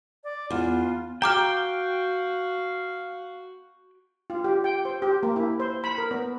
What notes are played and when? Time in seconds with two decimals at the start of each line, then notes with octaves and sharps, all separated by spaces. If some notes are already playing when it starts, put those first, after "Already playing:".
0.24 D5
0.50 E2 F4
1.22 F#4 F5 G5 A#5 D6 F6
4.30 F4
4.44 G4
4.64 G5
4.85 C5
5.02 G4
5.23 A#3
5.36 E4
5.60 C5
5.84 B5
5.98 A#4
6.11 B3